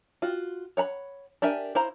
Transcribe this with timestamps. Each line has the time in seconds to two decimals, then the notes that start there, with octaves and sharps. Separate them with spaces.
0.22 F4 F#4
0.77 C#5 F#5 A#5 B5
1.42 D4 G4 A#4 E5 G#5
1.75 E4 C5 F5 A#5